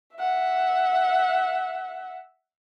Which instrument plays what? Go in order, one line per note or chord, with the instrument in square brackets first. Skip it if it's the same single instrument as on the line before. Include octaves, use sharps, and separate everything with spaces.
[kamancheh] E5 F#5